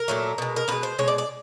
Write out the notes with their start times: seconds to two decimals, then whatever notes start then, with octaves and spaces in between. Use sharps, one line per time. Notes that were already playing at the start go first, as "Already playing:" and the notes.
Already playing: A#4
0.08 A#2 F#3 A3
0.38 B2 G#3
0.56 A#4
0.68 B2 G#3 B4
0.83 C5
0.98 B2 G#3 C#5
1.08 D5
1.18 D5